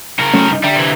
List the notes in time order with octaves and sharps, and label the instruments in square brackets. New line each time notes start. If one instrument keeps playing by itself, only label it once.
[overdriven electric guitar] C#3 A#4
[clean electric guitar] F#3 A3 C#4
G2 D#4
[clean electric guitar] D3 E5 A#5 [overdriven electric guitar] G3
[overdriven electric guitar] C3 E3